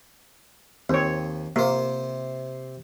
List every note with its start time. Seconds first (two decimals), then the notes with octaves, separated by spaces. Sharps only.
0.89 D#2 C4 C#5
1.56 C3 A#3 C5